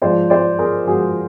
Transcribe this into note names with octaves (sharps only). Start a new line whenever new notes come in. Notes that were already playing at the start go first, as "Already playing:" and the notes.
G#2 F3 C5 D5
C5 D5
G#4 A#4
G#2 F3 F#4 G#4